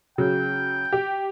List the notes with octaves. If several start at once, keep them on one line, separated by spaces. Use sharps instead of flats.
C#3 F#3 G5
G4